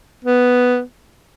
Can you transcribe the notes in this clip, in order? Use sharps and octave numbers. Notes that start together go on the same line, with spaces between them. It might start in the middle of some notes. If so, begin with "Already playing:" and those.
B3